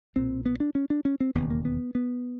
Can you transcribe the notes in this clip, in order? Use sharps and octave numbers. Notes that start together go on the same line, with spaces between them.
B1 A#2 C4
B3
D4
C#4
D4
C#4
C4
E1 D#2 C#3 B3
A#3
B3
B3